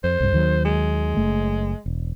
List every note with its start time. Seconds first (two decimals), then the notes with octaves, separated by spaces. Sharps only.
0.04 F2 C5
0.20 C2 G2
0.33 D#2 D#3 F#3
0.65 G#3
1.17 F#1 A3
1.86 E1